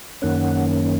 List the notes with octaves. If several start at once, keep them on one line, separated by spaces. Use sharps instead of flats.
F#2 D#3 A#3 C#4 F#5